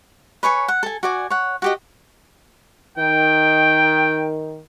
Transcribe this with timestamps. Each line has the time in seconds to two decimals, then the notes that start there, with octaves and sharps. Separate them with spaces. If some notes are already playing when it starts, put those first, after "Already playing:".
0.43 B4 C#5 G#5 C#6
0.68 F#5
0.83 A4 G#5
1.03 F#4 D5 G#5
1.30 C#5 F#5
1.62 F#4 G4 D#5
2.98 D#3 G5